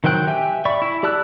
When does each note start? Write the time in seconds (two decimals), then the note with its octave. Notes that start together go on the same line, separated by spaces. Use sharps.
0.04 D#3 F#3 C5 G5 F#6
0.27 G4 E5 G5 G#5
0.65 D5 E5 B5 C#6
0.82 E4
1.03 G4 D5 A5 E6 F#6